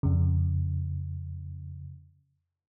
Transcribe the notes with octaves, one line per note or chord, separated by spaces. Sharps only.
F2 C#3